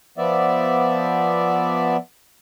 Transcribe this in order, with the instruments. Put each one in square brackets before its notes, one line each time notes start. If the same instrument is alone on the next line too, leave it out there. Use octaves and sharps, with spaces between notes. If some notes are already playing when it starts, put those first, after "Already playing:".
[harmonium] F3 B3 D5 E5